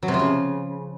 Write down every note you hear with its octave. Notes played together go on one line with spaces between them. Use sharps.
F#3
C3
F3
C#3